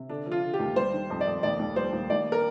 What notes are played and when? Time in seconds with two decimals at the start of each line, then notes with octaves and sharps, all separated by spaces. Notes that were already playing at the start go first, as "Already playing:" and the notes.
Already playing: C3
0.09 D3 D4
0.26 F3
0.32 F4
0.43 D3
0.54 G4
0.60 D#2
0.76 G3 C5
0.94 D#3
1.10 F2
1.21 D5
1.27 F2
1.43 D#2 D5
1.59 D#2
1.76 G3 C5
1.93 D#2
2.10 D#2 D5
2.32 A#4